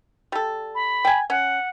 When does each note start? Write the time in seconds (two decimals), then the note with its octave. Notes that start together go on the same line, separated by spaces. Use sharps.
0.32 G3 A4
0.75 B5
1.05 G5 G#5
1.30 C#4 F#5